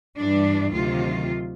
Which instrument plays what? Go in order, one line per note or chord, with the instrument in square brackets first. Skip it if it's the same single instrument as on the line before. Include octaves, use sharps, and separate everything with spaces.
[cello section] G2 E3 G3 D4
D2 C3 D#3 F#3 F4